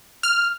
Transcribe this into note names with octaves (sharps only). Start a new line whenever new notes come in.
F6